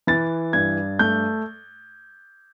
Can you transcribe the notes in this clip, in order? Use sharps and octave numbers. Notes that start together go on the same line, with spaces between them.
E3 A6
G2 G#6
A3 G6